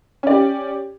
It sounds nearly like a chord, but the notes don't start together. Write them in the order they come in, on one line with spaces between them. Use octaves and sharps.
C#4 D5 G4